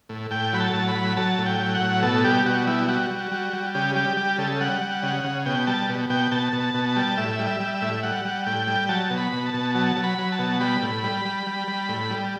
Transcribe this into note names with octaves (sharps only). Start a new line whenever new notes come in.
A2
A2 G5
F#3 B5
A5
A2
B5
F#3
F#3 A5
A2
G5
F#3
F#5
A2
B2 A4
G3 G4
B2 F#4
G3 E4
G3 F#4
G3
G3
G3
C#3 G4
G3 G4
G3 G4
C#3 A4
G3 F#5
G3
C#3
C#3
B2 G5
G3 A5
B2
B2 G5
B2 A5
B2
A5
B2
A5
G3
A2 E5
G3
E5
G3
E5
A2
G3 F#5
G3
A2 G5
G3
F#3 A5
B2
B5
B2
A5
B2
F#3 A5
F#3
B5
F#3
A5
B2
G3 B5
A2
G3
G3
G3
G3
A2
G3